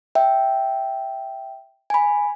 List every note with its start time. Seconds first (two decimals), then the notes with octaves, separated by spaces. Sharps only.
0.15 E5 G5
1.90 G#5 B5